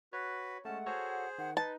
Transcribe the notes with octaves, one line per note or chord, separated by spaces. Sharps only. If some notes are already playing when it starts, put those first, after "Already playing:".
F#4 B4 C#5
G#3 A3 C#4 F#5 A5
F#4 G#4 A4 C5 C#5
D#3 F#5
D#4 B4 A5